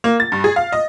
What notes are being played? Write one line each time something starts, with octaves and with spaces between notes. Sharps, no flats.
A#3
A6
G2
G#4
F5
D#5